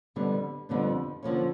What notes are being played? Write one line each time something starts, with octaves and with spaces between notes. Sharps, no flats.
F2 D3 G3 B3 D4
F2 D3 G3 B3 D4
D3 F3 A#3 C#4